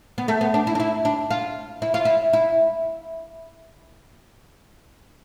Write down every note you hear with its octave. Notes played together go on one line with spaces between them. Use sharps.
B3
A3
B3
D4
E4
D4
E4
D4
F4
E4
F4
E4
E4